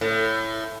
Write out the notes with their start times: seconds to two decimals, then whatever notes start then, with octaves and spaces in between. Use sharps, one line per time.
0.01 A2